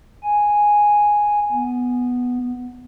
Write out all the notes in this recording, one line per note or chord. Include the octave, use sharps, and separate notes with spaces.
G#5
B3